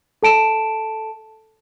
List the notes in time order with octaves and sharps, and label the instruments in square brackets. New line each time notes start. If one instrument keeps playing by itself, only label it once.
[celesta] A4 A5 D7 E7